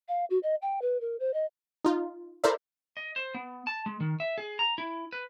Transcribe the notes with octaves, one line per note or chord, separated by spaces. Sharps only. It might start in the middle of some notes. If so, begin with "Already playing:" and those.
F5
F#4
D#5
G5
B4
A#4
C5
D#5
D#4 F4
E4 A4 A#4 C5 D5 E5
D#5
C5
B3
A5
G#3
D#3
E5
G#4
A#5
E4
B4